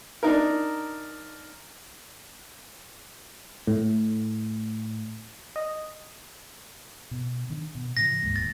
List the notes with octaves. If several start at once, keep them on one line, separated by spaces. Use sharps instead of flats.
D4 D#4 A#4
A2
D#5
B2
D#3 D4
B2
A2 C#3 F3 A#6
D#2 G#2 A#3
D#1 D2 A6